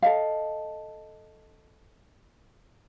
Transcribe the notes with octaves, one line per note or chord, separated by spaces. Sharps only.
A4 D#5 F5